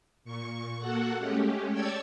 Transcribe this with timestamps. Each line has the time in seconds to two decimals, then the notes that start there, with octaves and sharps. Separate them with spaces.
0.25 A#2 C#6
0.79 A#3 F#4 A4 F#5
1.16 G#3 A3 C#4 G4
1.72 C#5 D5 G5 A5 E6 G#6